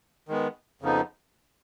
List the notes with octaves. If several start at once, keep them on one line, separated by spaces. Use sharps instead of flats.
D#3 G#3 B3
F2 C#3 F3 B3 D#4